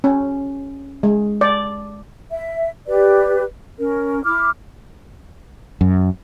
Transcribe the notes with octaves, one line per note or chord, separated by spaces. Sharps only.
C#4
G#3
D5
E5
G4 B4 D5
C#4 A#4
E4 D6 F6
F#2